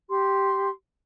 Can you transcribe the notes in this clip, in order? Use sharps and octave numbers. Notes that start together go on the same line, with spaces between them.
G4 C6